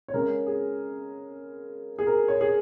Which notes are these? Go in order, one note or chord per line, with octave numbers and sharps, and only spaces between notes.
C#5
C#3 G#3 C#4 A#4
G#4
G#4
A#4
C#5
G#4